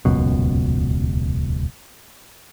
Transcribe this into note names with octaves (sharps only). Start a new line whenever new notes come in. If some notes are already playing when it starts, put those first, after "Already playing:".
D#1 C#2 F#2 B2